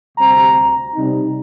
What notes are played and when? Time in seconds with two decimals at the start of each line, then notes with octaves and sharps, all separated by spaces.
0.18 D2 C3 G3 C4 A#5
0.94 C3 G3 C4 D#4